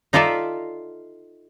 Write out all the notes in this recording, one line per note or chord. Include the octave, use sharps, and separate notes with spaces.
D#4 F4 A4 D5 E5